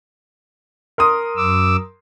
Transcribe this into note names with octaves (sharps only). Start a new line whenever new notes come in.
A#4 C6 D#6
F#2 D6 E6